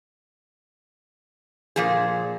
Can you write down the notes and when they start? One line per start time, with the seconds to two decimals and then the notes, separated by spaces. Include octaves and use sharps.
1.76 A#2 F3 G#4